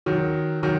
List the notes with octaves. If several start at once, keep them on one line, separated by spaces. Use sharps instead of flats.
D#3 F#3
D#3 F#3